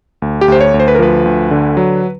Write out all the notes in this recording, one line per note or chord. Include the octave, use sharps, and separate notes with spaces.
D2
G4
D2 C5
C#5
D2
C5
B4
A#4
F3 B4
D2
D3
F#3